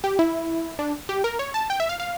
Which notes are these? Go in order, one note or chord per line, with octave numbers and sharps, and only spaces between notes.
G4
E4
D4
G4
A#4
C#5
A5
G5
E5
F5
F5